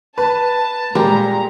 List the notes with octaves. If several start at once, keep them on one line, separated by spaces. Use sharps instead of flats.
B4 A5
A#2 G3 G#3 A#5